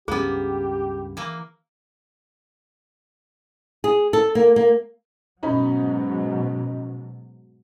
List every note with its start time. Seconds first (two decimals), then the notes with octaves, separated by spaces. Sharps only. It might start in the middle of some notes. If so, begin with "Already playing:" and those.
0.08 C#2 G2 A#3 B3 C#4 G4 G#4
1.17 E3 A#3
3.84 G#4
4.13 A4
4.35 A#3
4.56 A#3
5.43 G#2 B2 F#3 C#4 D#4 B5